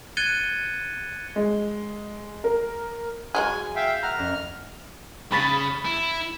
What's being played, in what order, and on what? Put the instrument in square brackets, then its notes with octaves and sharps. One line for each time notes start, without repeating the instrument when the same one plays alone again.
[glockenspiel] F#6 G#6 A6 C#7 D#7 G7
[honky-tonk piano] G#3
A#4
[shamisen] F#3 G#3 G#4 [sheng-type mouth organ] G#5
[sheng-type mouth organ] E5 F5 G5
[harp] E5 F#5 A#5 [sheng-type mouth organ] F6
[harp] F2 C#4
[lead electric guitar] C#3 [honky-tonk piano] B5 A6 B6
[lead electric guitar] E4